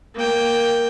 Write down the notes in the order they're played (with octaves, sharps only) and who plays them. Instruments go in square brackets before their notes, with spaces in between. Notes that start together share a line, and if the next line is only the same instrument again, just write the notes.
[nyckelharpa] A#3 G5